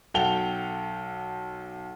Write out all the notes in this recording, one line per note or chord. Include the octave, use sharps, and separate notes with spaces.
B1 A4 F#5 G5 F7 G7